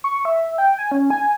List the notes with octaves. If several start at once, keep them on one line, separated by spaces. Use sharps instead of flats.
C#6
E5
G5
G#5
C#4
G#5